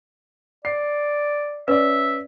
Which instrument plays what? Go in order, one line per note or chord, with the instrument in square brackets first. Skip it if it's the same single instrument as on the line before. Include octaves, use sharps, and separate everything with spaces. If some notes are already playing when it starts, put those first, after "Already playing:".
[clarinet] D5 [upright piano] C7
[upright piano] C#4 D5 [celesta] B4 [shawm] E5